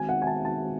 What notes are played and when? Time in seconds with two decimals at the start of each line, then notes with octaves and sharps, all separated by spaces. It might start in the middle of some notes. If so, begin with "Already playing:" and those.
Already playing: D#3 G#3 C4 F#4 G#5
0.09 F#5
0.22 G#5
0.27 A5
0.45 A5